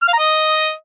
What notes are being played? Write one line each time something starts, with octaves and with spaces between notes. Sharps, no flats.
F6
F5
A#5
D#5